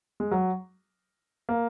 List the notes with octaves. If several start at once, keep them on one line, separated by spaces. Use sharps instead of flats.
G#3
F#3
A#3